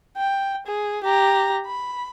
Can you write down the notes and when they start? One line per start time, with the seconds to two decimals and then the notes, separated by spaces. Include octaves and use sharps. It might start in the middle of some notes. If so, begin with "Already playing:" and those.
0.17 G5
0.66 G#4
1.04 G4 A#5
1.66 B5